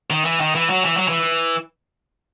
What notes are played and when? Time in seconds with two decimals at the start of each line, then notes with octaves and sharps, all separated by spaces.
0.10 D#3
0.25 E3
0.40 D#3
0.55 E3
0.70 F#3
0.85 E3
0.97 F#3
1.08 E3